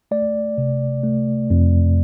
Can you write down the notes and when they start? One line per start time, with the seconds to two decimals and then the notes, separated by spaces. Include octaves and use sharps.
0.11 A3 D5
0.58 C3
1.04 A3
1.50 F2